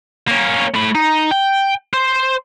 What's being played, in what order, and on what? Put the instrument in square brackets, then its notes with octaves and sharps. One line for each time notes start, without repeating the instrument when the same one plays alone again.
[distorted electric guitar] A#3 C#4
A3 B5
D#4
G5
C5